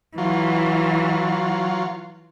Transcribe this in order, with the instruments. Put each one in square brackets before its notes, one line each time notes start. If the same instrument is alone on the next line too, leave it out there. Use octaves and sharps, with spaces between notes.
[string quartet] E3 [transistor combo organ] F#3 F4